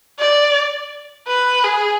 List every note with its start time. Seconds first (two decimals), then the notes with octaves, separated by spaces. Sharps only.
0.19 D5
1.28 B4
1.64 G#4